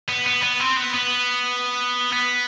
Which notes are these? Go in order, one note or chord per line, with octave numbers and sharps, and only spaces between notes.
B3
B3
B3
C4
B3
B3
B3